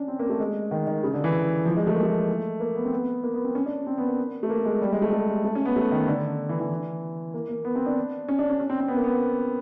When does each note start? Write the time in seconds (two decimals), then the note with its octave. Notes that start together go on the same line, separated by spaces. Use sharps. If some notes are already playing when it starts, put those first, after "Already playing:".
Already playing: C#4 D4
0.08 C4
0.19 A#3
0.30 A3
0.39 G#3
0.71 D#3
0.87 D#3
1.03 C#3
1.14 D3
1.24 E3
1.65 F3
1.76 G#3
1.87 A3
1.95 A#3
2.03 A3
2.60 A#3
2.76 B3
2.85 C4
2.92 B3
3.23 A#3
3.34 B3
3.45 C4
3.55 C#4
3.66 D4
3.87 C4
3.98 B3
4.07 A#3
4.43 A3
4.50 A#3
4.65 G#3
4.82 G3
4.92 G#3
5.02 A3
5.13 A3
5.44 A3
5.55 C#4
5.65 B3
5.76 A3
5.92 D#3
6.08 D3
6.49 E3
6.60 E3
7.34 A#3
7.49 A#3
7.65 B3
7.76 C4
7.86 D4
8.28 C#4
8.39 D4
8.50 C#4
8.60 C#4
8.70 C4
8.80 C4
8.88 B3
8.96 A#3
9.04 B3